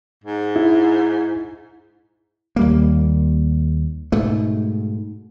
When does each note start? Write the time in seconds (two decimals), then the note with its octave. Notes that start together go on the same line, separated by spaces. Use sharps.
0.24 G#2
0.56 E4
2.56 D#2 G3 A#3
4.12 G#2 B2 A3